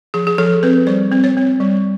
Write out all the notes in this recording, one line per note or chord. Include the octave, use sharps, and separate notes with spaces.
F3 G#4
G#4
F3 A4
C4 B4
G3 C5
C4
C#5
C4
G3